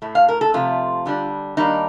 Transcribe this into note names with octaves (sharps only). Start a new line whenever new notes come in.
A2 A3
F5
A#4
A4
C3 F3 A3 F4
D3 G3 D4
D#3 G3 A#3 D4 D#4